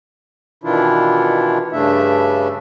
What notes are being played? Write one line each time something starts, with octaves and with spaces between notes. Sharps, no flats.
B2 D#3 E3 D4 E4 F4
G2 C#3 A3 D4 E5